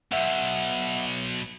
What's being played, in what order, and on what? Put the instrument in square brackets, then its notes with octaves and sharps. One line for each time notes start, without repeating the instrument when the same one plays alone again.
[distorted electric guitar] B1 B2 [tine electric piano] E5 F#5